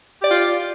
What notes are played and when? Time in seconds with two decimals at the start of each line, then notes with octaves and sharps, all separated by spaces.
0.20 G4
0.24 D5
0.28 F4